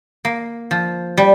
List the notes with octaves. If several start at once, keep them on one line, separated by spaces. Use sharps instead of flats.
A#3
F3
G3